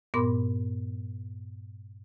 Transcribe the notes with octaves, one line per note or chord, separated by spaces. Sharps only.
G2 A#2 B3 A#4 C6 D6